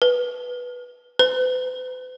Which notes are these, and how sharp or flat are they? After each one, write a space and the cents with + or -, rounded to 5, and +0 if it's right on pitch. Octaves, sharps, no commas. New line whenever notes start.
B4 -5
B4 +45